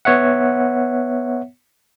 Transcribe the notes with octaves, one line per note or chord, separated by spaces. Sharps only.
B3 C#5 E5 F#5